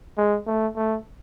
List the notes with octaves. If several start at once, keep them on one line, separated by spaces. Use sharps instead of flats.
G#3
A3
A3